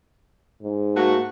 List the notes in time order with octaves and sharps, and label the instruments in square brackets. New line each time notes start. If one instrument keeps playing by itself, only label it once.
[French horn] G#2
[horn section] A3 A#3 F#4